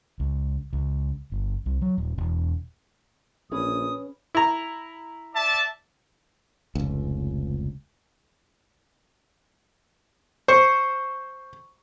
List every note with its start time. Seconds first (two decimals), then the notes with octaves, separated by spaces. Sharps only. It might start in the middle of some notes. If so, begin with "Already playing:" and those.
0.20 C#2
0.73 C#2
1.32 G1
1.66 C2
1.82 F#3
1.98 D#1
2.18 E1
3.51 A#1 C#4 G#4 B4 D#6
4.35 E4 A#5
5.35 D5 E5 A5
6.75 F1 C#2
10.48 C5 C#6